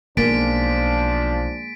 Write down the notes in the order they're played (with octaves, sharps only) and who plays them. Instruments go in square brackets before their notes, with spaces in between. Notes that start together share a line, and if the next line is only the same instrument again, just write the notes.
[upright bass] B1 [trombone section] F3 D4 [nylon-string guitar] G#3 A#3 [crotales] A6 B6 D7